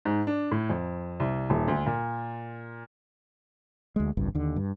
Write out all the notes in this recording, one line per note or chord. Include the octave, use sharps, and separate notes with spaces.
G#2
D4
A2
F2
C2
D#1
D2
A#2
D2 G#3
G#1 C#2 G2
D#2 D3
G2